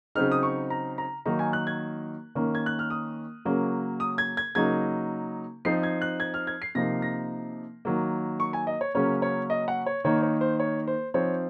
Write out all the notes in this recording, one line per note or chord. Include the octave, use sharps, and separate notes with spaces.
C#3 F#3 C4 D#4 F6
D#6
C#6
A#5
A#5
D#3 F#3 A#3 D#4 A#5
G#5
F#6
G#6
D#3 A#3 C#4
G#6
F#6
F6
D#6
C#3 F#3 A#3 C#4
D#6
G#6
G#6
C#3 F#3 A#3 D#4 G#6
F3 C4 D#4 C7
G#6
F#6
G#6
F6
G#6
C7
C3 F3 A#3 D#4 A#6
A#6
D#3 F#3 A#3
C#6
G#5
D#5
C#5
C#3 F#3 A#3 C#4 C#5
C#5
D#5
F#5
C#5
D#3 A#3 D#4 C#5
C#5
C5
C#5
C5
F3 C4 D#4 C#5